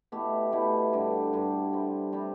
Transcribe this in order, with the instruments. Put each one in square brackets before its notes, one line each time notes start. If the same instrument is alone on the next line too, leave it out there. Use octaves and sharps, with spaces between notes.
[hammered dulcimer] B2 A3 E4 G4
B2 A3 E4 G4
G2 D3 G3
G2 D3 G3
C3 G3 C4
C3 G3 C4